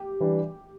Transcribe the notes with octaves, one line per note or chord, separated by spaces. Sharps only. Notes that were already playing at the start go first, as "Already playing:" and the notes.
Already playing: G4
E3 G3 D4